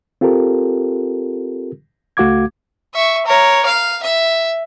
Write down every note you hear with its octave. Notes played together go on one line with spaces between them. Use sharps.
C4 F4 G4 A4 A#4
C#2 A3 F#4 F5 D6 G#6
E5 C#6
A#4 C#5
F5
E5